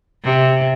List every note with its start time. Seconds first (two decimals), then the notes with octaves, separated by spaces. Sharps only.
0.24 C3